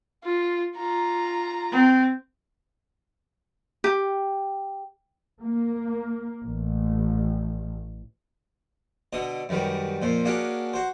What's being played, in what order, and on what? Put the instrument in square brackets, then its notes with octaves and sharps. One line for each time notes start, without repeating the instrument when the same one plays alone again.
[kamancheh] F4
F4 A#5
[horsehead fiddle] C4
[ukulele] G4
[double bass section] A#3
A1
[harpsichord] B2 D3 D#5 D#6
F#2 D#3 G3 B3
F2 A#2 C5
A#3 C#4 D4 F#4 G#4
F#4 C5